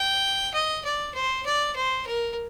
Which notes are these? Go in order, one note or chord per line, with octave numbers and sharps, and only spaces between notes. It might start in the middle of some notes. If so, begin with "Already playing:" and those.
Already playing: G5
D#5
D5
C5
D5
C5
A#4